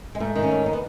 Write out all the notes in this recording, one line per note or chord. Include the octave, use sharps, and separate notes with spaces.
G#3
G#2 A3
D#3
C#4
G#2
D#4
B3